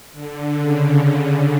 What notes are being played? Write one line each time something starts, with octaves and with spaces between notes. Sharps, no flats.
D3
C#3
C#3